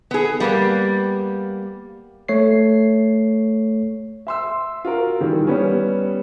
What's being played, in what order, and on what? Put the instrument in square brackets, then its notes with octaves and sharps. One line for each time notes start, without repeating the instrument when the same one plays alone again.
[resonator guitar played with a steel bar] B3 G#4
G3 A#3 B3
[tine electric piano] A3 C#5 C7
[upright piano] E5 C6 E6
F4 F#4 A#4
D#3 E3 G3
G3 B3 C#4